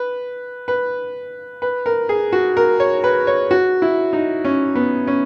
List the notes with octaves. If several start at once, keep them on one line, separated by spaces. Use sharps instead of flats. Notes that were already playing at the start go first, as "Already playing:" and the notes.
Already playing: B4
B4
B4
A#4
G#4
F#4
A#4
C#5
B4
C#5
F#4
E4
D#4
C#4
B3
C#4